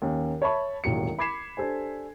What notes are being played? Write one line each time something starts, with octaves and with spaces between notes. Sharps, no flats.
D#2 C#4
C#5 E5 A5 B5 C#6
E1 A1 D#2 F#3 C#7
B5 D6 G#6 B6 C7 E7
D4 G4 A4 C5 G#5